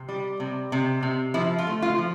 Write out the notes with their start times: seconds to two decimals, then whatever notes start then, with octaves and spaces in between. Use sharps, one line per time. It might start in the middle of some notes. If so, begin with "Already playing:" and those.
Already playing: C3
0.09 G3
0.40 C3
0.72 C3
1.03 C3
1.34 F3 E4
1.59 F4
1.67 A3
1.82 F4
1.98 F3